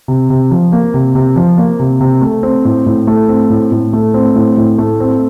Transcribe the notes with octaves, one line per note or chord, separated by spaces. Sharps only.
C3
C3
F3
A#3
C3
C3
F3
A#3
C3
C3
A3
C4
A2
A2
A3
C4
A2
A2
A3
C4
A2
A2
A3
C4